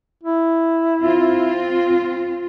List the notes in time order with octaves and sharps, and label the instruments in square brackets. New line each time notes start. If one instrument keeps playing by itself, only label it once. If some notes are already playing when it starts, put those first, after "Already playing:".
[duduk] E4
[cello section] C4 F4